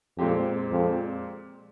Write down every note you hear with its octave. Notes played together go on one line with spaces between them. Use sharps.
F2 A#2 G#3 C4 G4
F2